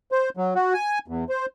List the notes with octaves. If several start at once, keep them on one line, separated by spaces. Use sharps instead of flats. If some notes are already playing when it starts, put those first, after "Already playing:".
C5
F#3
F#4
G#5
E2
C5